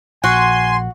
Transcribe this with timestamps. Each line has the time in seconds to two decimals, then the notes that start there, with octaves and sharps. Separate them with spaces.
0.24 A#1 F#4 G#5 C6